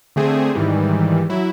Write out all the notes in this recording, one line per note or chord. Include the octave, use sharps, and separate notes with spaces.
D3 A3 C4 G#4
G#2 D#3 E3 G3
F#3 E4